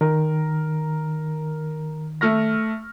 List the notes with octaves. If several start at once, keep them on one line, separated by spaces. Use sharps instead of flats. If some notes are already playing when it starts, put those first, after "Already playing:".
D#3 A#4
A3 F6 A#6